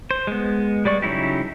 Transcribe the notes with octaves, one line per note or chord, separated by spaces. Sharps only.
C5
G#3 B3
G3 G#3 D5 C#6
C#3 F#3 D#4 E4 G4